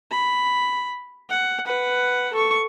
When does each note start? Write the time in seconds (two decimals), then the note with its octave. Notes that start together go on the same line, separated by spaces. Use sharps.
0.11 B5
1.29 F#5
1.66 B4 F#5
2.33 A4 C#6